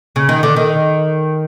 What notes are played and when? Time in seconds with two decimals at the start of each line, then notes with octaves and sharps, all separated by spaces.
0.16 C#3
0.29 D#3
0.43 D3
0.56 D#3